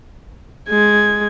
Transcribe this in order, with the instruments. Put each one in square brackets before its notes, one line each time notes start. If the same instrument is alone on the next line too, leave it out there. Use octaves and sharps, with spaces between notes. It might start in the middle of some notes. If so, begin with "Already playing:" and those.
[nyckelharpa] G#3 [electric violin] G#6